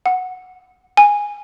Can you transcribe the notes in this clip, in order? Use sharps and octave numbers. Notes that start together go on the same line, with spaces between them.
F#5
G#5